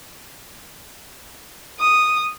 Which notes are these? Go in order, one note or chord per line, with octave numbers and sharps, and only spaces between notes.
D#6